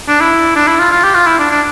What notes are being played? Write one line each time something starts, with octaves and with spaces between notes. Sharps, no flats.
D4
E4
D4
E4
F4
F4
G4
F4
E4
D4
D4